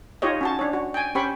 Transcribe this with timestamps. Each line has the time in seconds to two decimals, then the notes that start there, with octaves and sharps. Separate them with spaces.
0.22 D#4 F4 G4 C#5 D#5
0.41 C#4 F#4 A5
0.59 D4 C#5
0.73 F#4
0.94 G5 G#5
1.15 C#4 G4 C5 G5 B5 C#6